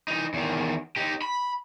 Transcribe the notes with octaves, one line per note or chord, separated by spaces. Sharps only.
E3 D#4
E2 D#3
D#4 G4
B5